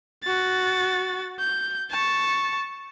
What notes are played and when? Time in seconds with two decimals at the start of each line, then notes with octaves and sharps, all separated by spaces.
0.24 F#4 A6
1.40 G6
1.91 A5 C#6